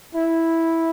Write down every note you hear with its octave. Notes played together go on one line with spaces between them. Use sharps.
E4